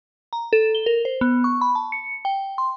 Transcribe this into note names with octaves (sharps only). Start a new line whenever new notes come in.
A#5
A4
G7
A#4
C5
B3
C#6
B5
A5
C#7
G5
C6